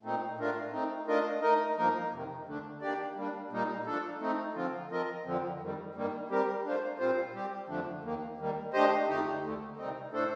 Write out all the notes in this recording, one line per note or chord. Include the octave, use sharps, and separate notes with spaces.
A#2 A3 C4 D#4
A2 A3 D4 F4 A#4
A3 C4 D#4
A3 D4 F4 A#4 D#5
A3 D#4 A#4 D#5
G2 F3 A#3 D#4 A#4
F2 C3 D#3
D2 D3 A3 D4
D#3 A#3 D4 G4 D5
G3 A#3 D4
A#2 G3 A#3 D#4
F3 A3 D4 A4
A3 C4 D#4
D3 F3 C4 F4
F3 C4 F4 A#4 D#5
F2 D3 F3 C4
F2 D#3 G3
G2 D#3 G3 A#3
G3 C4 G4 A#4
A3 D4 F4 C5
A#2 G3 C4 F4 C5
G3 C4 G4
F2 D3 F3 A3 D4
D#2 D#3 A#3
D#2 D#3 G3 A#3
A3 D4 G4 C5 D#5
F2 D3 A3 D#4 G4
D2 D3 A3
C3 D#3 G3 C4 D#4
A2 A3 D4 A4 C5